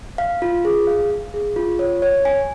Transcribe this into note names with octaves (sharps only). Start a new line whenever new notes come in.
F5
F4
G#4
F5
F5
G#4
F4
C#5
C#5
G#5